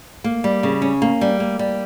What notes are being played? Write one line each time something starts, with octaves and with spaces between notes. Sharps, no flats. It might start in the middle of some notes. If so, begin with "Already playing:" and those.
A#3
G3
C#3
C#4
A#3
G3
A#3
G3